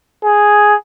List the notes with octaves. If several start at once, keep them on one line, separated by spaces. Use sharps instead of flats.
G#4